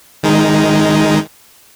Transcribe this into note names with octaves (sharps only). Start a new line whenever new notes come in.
D#3 G#3 D#4